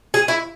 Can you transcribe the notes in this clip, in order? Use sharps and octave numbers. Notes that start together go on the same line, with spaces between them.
G#4
E4